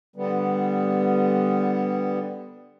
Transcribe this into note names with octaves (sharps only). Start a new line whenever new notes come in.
D3 G3 B3